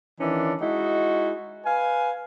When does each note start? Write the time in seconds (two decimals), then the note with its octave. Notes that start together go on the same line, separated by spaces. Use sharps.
0.21 D#3 E3 C#4 D4
0.62 G#3 D#4 E4 F#4
1.66 B4 F5 G#5